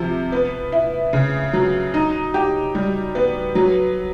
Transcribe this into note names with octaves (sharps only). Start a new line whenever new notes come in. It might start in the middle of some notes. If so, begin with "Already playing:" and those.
Already playing: C3 F3
B3
E4
C#3
F#3
D#4
G4
G3
B3
F#3